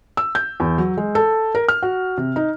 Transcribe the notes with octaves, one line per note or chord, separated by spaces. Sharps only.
E6
G6
E2
F#3
G#3
A4
A#4
F6
F#4
C3
D#4